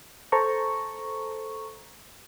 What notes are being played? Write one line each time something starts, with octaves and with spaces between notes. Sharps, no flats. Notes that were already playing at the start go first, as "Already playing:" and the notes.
A4 C5 A5 A#5 C#6